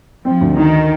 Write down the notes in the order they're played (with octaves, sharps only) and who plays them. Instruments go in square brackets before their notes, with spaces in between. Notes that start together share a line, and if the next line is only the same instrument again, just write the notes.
[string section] F3 [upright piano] C4
[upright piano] D2
[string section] D#3 [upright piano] D#4